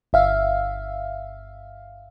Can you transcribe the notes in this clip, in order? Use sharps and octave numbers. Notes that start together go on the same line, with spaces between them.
G1 E5 F5